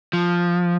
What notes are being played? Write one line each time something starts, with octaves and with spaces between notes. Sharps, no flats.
F3